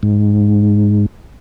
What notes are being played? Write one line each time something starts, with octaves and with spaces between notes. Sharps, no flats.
G#2